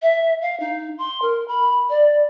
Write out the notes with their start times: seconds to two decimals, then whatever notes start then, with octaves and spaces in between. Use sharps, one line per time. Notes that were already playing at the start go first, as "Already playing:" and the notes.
0.02 E5
0.42 F5
0.60 D#4
0.98 C6
1.22 A#4
1.48 B5
1.90 D5